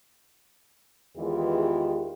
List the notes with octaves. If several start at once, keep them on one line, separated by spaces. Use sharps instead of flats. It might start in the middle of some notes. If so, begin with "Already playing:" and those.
E2 D#3 E3 G#3 F4 G4